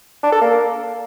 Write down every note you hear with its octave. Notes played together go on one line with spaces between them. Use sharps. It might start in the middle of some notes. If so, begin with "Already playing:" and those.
D4
A4
A#3